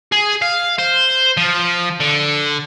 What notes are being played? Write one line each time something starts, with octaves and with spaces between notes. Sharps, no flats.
G#4
F5
C5
F3
D3